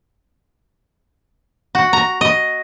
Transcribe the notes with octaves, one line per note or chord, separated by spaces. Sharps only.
F#4
A#5
D#5